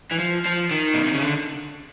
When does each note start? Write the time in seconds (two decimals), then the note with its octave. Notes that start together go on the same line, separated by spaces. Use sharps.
0.11 E3
0.19 F3
0.45 F3
0.71 D#3
0.94 B2
1.04 C3
1.14 C#3
1.23 D3